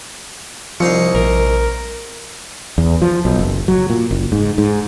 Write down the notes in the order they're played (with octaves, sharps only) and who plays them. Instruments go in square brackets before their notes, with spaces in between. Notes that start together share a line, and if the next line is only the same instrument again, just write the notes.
[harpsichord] C2 D#4 F5 [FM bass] F3 [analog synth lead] C#7
[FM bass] A#1 [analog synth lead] A#4
[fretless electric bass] E2
F3
B1
F#1
F#3
A#2
F#1
G#2
G#2